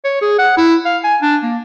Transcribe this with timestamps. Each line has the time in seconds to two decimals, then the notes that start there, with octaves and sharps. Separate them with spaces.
0.04 C#5
0.21 G#4
0.38 F#5
0.57 E4
0.85 F5
1.04 G#5
1.22 D4
1.43 A#3